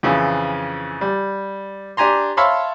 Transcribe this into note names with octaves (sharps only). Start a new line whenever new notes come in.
F2 C#3 E3
G3
D4 G4 G#5 A#5 C6
C#5 E5 F5 A5 B5 C6